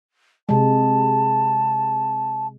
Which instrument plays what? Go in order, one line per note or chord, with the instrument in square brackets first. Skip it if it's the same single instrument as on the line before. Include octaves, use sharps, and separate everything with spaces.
[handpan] C3 G#3 [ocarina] A5